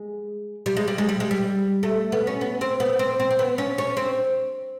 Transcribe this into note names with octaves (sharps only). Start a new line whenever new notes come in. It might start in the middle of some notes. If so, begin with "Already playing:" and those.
Already playing: G#3
G3
G#3
G3
G#3
G3
G#3
G3
A3
B3
C#4
B3
C4
B3
C4
C4
C4
B3
C#4
C#4
C4